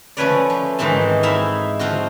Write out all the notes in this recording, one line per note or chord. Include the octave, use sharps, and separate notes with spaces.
F3 A3 C#4 B4 C#5 D5
F3
G#2 D#3 E3 C4 A5
D#4 E4 E5 F5
F3 C4 F4 F#4